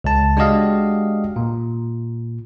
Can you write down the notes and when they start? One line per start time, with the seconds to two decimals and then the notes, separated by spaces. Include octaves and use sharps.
0.04 C#2 A5
0.37 G#3 D4 F#4 G4 D#5 F5
1.36 A#2